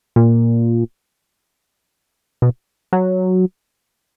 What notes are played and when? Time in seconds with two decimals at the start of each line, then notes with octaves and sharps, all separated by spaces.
0.16 A#2
2.42 B2
2.93 F#3